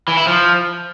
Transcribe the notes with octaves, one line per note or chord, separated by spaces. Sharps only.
E3
E4
F3